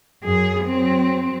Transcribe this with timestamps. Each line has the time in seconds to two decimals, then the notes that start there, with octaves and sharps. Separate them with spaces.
0.24 F#2 G#4
0.65 F#3 C4